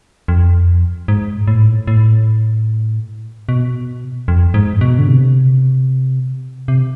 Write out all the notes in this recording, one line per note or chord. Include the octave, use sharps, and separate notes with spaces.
F2
G#2
A2
A2
B2
F2
G#2
B2
D3
C3
C3